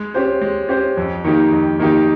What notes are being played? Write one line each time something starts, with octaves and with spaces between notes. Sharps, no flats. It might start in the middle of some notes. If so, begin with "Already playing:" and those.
Already playing: G#3
C#4 G4 C5
G#3
C#4 G4 C5
F2
D#3 A#3 D#4 G4
F2
D#3 A#3 D#4 G4